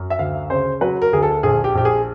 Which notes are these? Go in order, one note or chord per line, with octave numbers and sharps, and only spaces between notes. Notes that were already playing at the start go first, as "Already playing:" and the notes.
Already playing: F#2
E5
D2 F5
C#3 C5
F#3 B4
A#4
D2 G#4
A4
A#1 G#4
G4
A#1 G4
G#4